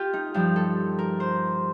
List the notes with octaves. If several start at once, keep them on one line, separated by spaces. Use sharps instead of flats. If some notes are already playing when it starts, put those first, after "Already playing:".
Already playing: F4 G4 A4
D#4
G2 F3 G4
A4
A#4
C5